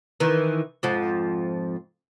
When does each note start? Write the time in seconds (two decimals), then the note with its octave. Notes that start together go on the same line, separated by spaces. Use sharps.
0.20 D#3 E3
0.83 F2 G#2 F3